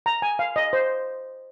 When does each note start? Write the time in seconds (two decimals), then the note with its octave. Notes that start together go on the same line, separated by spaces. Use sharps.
0.06 A#5
0.22 G#5
0.39 F5
0.56 D#5
0.73 C5